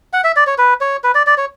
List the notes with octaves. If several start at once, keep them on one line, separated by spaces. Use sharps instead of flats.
F#5
E5
D5
C#5
B4
C#5
B4
D5
D5
C#5